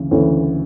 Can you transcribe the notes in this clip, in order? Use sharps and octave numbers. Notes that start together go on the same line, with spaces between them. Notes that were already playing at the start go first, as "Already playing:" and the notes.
Already playing: D2 C#3 E3
D2 C#3 E3